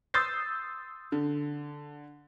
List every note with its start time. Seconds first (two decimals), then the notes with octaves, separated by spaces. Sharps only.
0.14 C6 D#6 E6 G6 A6 C7
1.12 D3